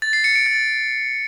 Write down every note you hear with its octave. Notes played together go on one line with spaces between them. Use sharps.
A6
C7
C#7
D7
A6